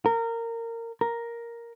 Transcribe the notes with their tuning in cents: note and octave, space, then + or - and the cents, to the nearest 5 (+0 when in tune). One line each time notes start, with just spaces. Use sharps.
A#4 -20
A#4 +5